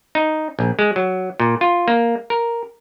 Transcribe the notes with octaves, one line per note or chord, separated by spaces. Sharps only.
D#4
A#1
G#3
F#3
A#2
F4
A#3
A#4